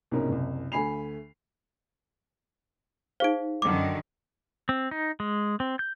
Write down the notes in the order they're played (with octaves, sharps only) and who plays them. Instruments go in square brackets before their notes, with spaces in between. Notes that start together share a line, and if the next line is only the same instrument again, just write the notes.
[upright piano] C2 G#2 B2 C#4 A#4
F#1 C2
D2 A3 G#5 B5 C7 F7
[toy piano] D#4 G#4 F5 [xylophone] C5 D7
[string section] F#2 D3 D#3 [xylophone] D6
[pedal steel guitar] C4
D#4
G#3
C4
G6